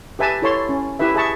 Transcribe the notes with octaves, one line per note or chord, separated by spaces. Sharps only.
G4 B4 E5 G#5 A5
E4 A4 C#5 A5 C6
C#4
E4 G4 B4 E5
G#4 E5 A5 C#6